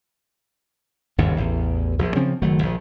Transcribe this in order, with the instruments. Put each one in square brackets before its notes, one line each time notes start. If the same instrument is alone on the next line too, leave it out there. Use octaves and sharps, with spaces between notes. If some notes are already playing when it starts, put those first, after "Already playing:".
[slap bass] G1 D#2 G#2 C#3
A1 E2
A#1 F3
C#3 F3 C4 C#4
F#1 D#3 F#3 A3
A#1 F3